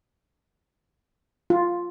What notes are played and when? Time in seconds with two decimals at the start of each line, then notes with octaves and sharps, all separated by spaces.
1.50 F4